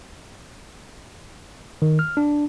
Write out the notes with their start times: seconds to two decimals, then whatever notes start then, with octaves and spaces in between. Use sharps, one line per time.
1.82 D#3
1.99 F6
2.17 D4